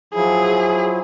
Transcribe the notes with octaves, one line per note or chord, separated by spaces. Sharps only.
F3 F#3 E4 G#4